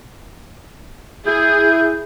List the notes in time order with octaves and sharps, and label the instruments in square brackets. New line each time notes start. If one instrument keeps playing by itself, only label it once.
[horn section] E4 [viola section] G#4 [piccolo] G6